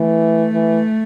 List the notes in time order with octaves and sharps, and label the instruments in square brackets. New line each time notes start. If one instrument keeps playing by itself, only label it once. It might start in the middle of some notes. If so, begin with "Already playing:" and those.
Already playing: [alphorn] E3 [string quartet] A3
[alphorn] E3